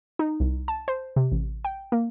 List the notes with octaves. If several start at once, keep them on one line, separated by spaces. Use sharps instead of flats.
D#4
C2
A5
C5
C3
A1
G5
A#3